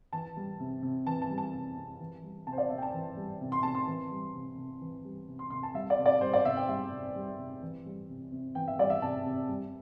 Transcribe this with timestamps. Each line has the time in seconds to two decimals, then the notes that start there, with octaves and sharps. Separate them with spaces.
0.13 E3 A5
0.36 G3
0.60 C3
0.82 C3
1.06 E3 A5
1.22 A5
1.30 G3
1.38 A5
1.53 C3
1.76 C3
2.00 E3
2.23 G3
2.46 C3 A5
2.52 C5
2.58 D5
2.70 C3 E5
2.78 G5
2.82 A5
2.94 E3
3.17 G3
3.41 C3
3.52 C6
3.63 C3 A5
3.75 C6
3.87 E3
4.11 G3
4.34 C3
4.57 C3
4.81 E3
5.05 G3
5.28 C3
5.39 C6
5.50 C3 C6
5.63 A5
5.74 G3 E5
5.90 D5
5.99 C3
6.06 D5
6.21 G3 C5
6.33 D5
6.45 C3 E5
6.57 G5
6.68 G3 E5
6.92 C3
7.15 G3
7.39 C3
7.62 E3
7.86 G3
8.09 C3
8.31 C3
8.55 E3 G5
8.68 E5
8.79 G3 D5
8.90 E5
9.02 C3 A5
9.25 C3
9.48 G3